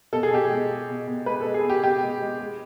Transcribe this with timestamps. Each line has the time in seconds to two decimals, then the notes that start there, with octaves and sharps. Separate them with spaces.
0.13 B2 A4
0.23 G#4
0.31 B2 G4
0.45 G#4
0.50 G#3
0.70 G#3
0.88 B2
1.07 B2
1.26 G#3 B4
1.41 A4
1.45 G#3
1.54 G#4
1.64 B2
1.70 G4
1.83 B2 G4
2.03 G#3
2.22 G#3
2.40 G#3